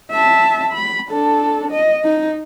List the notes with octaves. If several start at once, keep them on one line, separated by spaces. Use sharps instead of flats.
E5 A5
B5
D4 A4
D#5
D#4